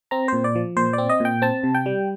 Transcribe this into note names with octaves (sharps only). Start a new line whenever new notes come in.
C4 A#5
A#2 C5
D5
F3
A#2 C5
C4 D5
D#5
A#2 G5
C4 A5
C3
G5
G3